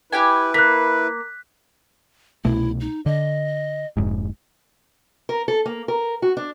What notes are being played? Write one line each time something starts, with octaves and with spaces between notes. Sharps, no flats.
E4 G4 B4 G5 G#5
A#3 F#6 B6
C2 B2 A3 E4
D#4
D3 D#5
F1 G#2
A#4
A4
A#3
A#4
F#4
D4